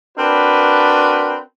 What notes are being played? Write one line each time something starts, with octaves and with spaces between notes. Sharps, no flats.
C4 D4 F#4 A#4 B4